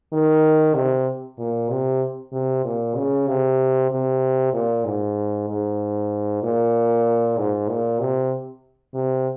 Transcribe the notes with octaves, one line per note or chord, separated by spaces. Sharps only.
D#3
C3
A#2
C3
C3
A#2
C#3
C3
C3
A#2
G#2
G#2
A#2
G#2
A#2
C3
C3